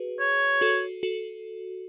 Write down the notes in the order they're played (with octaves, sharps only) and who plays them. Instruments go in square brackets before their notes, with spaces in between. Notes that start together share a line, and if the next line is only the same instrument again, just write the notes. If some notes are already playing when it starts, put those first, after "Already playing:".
Already playing: [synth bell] F#4 G#4 B4
[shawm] C#5
[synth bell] F#4 A4
F#4 A4